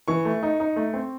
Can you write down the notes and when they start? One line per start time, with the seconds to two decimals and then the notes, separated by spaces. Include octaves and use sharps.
0.08 E3 C#6
0.25 A3
0.43 D#4
0.60 D#4
0.76 A3
0.94 C4